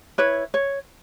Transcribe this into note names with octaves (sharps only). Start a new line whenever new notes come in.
E4 B4 C#5
C#5